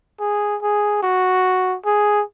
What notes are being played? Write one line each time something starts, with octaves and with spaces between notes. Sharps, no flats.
G#4
G#4
F#4
G#4